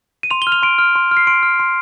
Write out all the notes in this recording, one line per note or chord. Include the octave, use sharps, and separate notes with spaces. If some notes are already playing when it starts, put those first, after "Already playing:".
D#7
C6 F7
G7
F6
F7
C6 D7
F6
C6
F6
C7
C6 D7
F6
C6